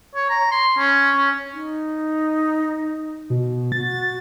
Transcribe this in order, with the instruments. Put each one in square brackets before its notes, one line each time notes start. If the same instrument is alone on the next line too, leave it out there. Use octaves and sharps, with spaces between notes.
[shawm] C#5
A#5
C6
C#4
C#4
[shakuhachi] D#4
[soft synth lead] B2
[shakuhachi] F#4 [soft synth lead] A6